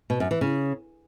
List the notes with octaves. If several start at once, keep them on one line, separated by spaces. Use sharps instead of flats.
B2
F#2
E3
C#3